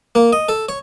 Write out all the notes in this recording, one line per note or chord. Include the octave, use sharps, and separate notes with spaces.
A#3
D#5
A4
C#5